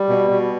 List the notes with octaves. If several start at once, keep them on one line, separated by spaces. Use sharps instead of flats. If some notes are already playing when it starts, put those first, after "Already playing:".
Already playing: G3
B2
B2